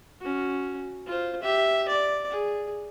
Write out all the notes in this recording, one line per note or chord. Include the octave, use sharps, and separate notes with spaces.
C#4 F#4
F4 C5
G4 E5
D5
G#4